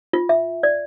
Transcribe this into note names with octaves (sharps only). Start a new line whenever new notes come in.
F4
E5
D5